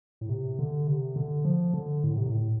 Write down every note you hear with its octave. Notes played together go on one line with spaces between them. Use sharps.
A2
C3
D3
C3
D3
F3
D3
A2
C3
A2